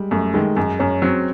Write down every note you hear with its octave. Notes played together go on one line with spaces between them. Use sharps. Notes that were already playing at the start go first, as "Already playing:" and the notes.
Already playing: G3 G#3
F#2 A3
D#3 G#3
F#2 G#3
F#2 C#4
F#3 C4